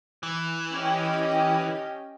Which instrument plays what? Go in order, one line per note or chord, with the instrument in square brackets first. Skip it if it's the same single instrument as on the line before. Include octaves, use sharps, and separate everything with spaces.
[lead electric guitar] E3
[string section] C#4 G4 D#5